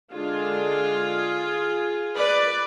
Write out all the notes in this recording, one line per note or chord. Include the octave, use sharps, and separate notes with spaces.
D3 G#3 D4 F4 G#4
B4 D5